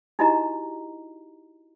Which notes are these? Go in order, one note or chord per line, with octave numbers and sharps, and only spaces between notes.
D#4 E4 F#4 G4 D#5 A#5